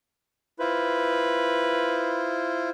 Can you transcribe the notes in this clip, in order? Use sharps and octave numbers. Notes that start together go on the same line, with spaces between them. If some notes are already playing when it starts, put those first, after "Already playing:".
E4 F4 B4 C5